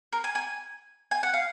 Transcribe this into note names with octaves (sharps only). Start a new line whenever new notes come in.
A#4
G#5
G#5
G#5
F#5
F5